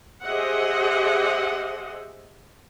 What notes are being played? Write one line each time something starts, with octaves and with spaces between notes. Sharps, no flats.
G4 G#4 C5 D#5 E5 F#5